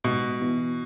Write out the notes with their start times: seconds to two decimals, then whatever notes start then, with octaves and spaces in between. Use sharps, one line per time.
0.04 G#2 B2
0.40 E3 B3 F#4